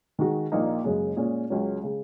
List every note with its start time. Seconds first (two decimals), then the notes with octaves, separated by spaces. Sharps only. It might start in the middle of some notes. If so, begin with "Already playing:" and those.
0.19 D#3 G#3 F#4
0.52 A#1 A#2 A#3 D#4
0.85 F#1 F#2 C#3 G#3
1.17 A#2 G#3 C#4 G#4
1.50 C#2 C#3 F#3 C#4
1.83 C#3 G#3